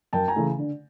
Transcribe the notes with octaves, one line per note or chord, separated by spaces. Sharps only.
F#2 G5 A5
G#5 A#5
C#3 E3 A3 C#4
D3